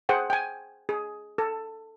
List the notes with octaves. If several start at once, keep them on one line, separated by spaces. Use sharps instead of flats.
G#4 C5 F#5 G5
G5 G#5
G#4
A4